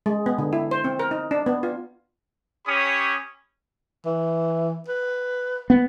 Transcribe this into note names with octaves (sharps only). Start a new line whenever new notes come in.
G#3
B3
D3
E4
C5
C4
A#4
D#4
D4
B3
F4
C#4 G4 C#5 B5 D#6
E3
B4
B3